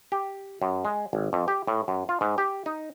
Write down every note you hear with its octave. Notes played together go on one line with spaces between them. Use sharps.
G4
F#2
G#3
G#1
F2
G4
A2
F#2
F4
G#2
G4
D#4